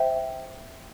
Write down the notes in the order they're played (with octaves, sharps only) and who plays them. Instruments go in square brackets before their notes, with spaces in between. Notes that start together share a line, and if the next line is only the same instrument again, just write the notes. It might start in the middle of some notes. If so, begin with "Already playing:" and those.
Already playing: [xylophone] C5 E5 G5